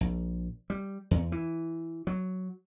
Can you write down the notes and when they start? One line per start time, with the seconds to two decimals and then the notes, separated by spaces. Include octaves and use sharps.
0.01 A#1
0.70 G3
1.11 E2
1.32 E3
2.07 F#3